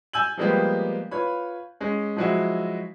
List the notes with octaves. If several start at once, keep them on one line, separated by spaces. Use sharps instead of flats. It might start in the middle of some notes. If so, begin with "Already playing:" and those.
G#5 E6 G6 F#7
F3 G3 G#3 A#3 B3 G4
F4 B4 C#5 B5
G#3 C#4
F3 F#3 G#3 E4 F#4 E5